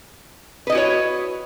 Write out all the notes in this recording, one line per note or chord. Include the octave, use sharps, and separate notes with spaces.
E4 F#4 B4 C#5 D#5